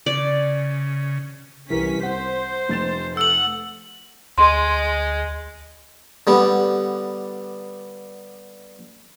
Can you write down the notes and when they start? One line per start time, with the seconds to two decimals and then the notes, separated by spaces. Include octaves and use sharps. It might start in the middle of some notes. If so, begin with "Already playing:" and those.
0.06 C#3 D5
1.70 C2 E3 C#4 G4 A#4 B6
2.03 C5 F#5
2.69 F1 A6 E7
3.17 A4 F#5 E6 F#7
4.38 D2 G#3 C6
6.27 D3 G3 B3